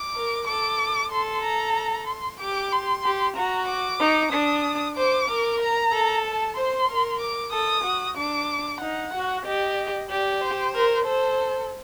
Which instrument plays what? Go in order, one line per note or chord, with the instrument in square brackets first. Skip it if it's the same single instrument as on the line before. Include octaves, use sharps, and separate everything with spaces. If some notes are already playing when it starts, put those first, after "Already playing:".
Already playing: [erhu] D6
[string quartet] A#4
[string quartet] A4 [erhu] D6
[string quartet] A4 [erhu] C6
[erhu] A#5
C6
[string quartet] G4 [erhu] D6
[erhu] C6
[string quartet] G4
[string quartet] F#4 [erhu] A#5
[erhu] D6
[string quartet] D#4
[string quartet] D4 [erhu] D#6
[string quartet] C5 [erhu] D6
[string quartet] A#4
[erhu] A#5
[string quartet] A4
[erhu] A5
[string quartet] C5 [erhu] C6
[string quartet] A#4
[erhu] D6
[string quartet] A4 [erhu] D#6
[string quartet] F#4
[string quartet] D4 [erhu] D6
[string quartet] D#4 [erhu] F#5
[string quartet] F#4
[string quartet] G4 [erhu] D#5
[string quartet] G4 [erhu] D5
[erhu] C5
[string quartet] A#4
[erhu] A4 [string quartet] C5